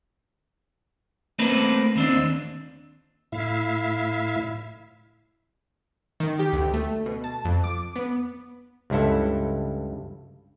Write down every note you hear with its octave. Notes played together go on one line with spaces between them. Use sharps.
A3 A#3 C4 D4 A#4 B4
D#2 C4 D4
A2 E4 E5 F5
D#3
G4
D2
A3
B2
A5
F2
D6
B3
C#2 G2 E4 A4